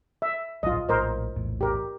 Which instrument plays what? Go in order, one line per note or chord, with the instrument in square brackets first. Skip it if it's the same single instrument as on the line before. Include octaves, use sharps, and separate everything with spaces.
[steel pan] E5
[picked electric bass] D1 A#1 F#3 [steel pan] F4 D#5
[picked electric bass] A#1 A2 [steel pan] A#4 C5 D#5
[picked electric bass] A#1 E2 A2
[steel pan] G4 A#4